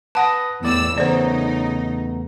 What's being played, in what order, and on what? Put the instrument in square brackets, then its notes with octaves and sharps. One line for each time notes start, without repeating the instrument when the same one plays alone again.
[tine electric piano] B4 D#6 A#6 [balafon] F#5 A5
[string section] E2 E6 [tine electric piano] A2 D5
[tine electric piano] E2 A3 B3 [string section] C#3 D#4 [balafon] C5 D5